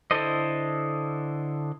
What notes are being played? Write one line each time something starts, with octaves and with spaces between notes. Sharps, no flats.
D3 E4 A4 C5 D#5